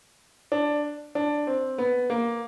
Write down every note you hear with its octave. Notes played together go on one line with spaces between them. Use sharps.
D4
D4
C4
B3
A#3